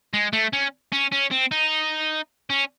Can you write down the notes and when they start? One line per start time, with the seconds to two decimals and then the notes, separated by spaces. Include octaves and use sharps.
0.14 G#3
0.33 A3
0.53 C#4
0.92 C#4
1.12 C#4
1.31 C4
1.51 D#4
2.50 C#4